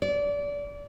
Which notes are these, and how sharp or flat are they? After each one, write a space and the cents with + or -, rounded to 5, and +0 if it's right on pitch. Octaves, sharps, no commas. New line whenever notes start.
D5 -25